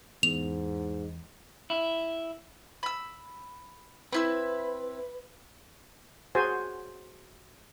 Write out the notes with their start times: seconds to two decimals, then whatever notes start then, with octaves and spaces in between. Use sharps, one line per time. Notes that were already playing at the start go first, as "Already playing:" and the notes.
0.23 E2 G#2 F7
1.70 E4
2.83 B5 E6
4.12 C4 E4 B4 E6
6.35 F#4 G#4 C5 G#5